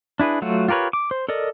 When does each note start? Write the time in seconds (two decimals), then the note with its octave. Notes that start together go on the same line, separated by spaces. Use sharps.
0.20 D4 E4 G#4 B4
0.42 F#3 A3 F4 F#4
0.68 F4 G4 A#4 B4 C#5
0.93 D6
1.11 C5
1.29 A4 A#4 D5 D#5